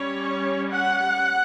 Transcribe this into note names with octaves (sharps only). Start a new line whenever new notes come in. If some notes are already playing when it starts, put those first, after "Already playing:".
Already playing: G3 C#4 C#5
F#5